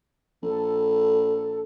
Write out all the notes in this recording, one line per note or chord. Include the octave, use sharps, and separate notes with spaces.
A#1 A4